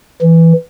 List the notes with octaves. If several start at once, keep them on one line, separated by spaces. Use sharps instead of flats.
E3